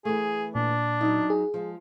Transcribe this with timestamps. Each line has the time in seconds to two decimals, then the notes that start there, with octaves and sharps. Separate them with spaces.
0.05 E3 A3 G#4
0.55 A#2 D4
1.01 F#3 D#4
1.30 G#4
1.54 F3 G#3